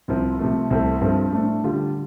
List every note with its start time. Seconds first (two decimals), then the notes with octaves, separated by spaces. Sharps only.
0.08 C2 C3 F3 C4
0.39 C3 F3 A3
0.70 C2 C3 A3 C4 A4
1.01 G2 F3 C4 A4
1.32 A2 A3 D4
1.64 D3 G3 F4